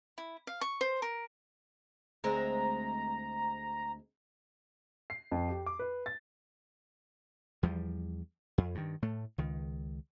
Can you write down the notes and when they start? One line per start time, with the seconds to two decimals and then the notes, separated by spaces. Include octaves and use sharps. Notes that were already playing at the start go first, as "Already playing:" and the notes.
0.18 E4
0.47 F5
0.61 C#6
0.81 C5
1.02 A#4
2.24 D2 G#3 C4 A#5
5.10 C7
5.31 F2
5.48 G4
5.66 D6
5.79 B4
6.06 A6
7.63 E2 F3 G3
8.58 F2
8.75 G2 D#3
9.02 A2 A3
9.38 C#2 D#3